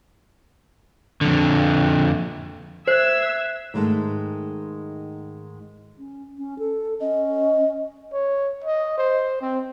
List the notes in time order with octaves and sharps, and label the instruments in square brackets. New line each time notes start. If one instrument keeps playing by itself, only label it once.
[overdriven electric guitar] F2 D3
[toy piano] C5 [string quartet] E5 E6 G#6 [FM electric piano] F#6 C7
[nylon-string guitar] G#2 D#3 G#3 A3
[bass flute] C#4
C#4
A4
[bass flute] C#4 [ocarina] D#5
[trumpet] C#5
D#5
C5
C4